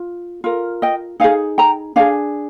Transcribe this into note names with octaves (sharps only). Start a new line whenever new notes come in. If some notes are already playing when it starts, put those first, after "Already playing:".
Already playing: F4
F4 A#4
D#5 G5
D#4 G#4 F5 G#5
G5 A#5
D4 G#4 F5 G#5